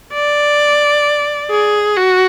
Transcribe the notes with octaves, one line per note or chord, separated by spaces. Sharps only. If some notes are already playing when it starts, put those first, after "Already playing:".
D5
G#4
F#4